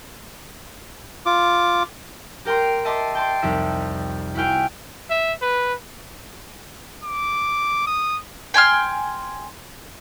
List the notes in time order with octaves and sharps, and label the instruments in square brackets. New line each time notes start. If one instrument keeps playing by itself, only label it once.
[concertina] F4 D6
[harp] G4 A#4 G5 A#5 C6
D#5 E5 A5 C6 D6
G5 A5 C6
C2 F2 D#4 E5
E4 F#4 F5 G5 G#5
[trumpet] E5
B4
[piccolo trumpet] D6
D#6
[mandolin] G5 G#5 C6 F6